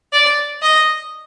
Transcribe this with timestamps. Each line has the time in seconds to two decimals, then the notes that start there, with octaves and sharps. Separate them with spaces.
0.13 D5
0.62 D#5